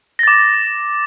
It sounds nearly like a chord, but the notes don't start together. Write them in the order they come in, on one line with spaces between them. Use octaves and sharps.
A#6 A6 D6